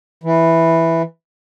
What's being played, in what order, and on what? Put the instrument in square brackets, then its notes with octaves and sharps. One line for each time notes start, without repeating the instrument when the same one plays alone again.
[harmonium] E3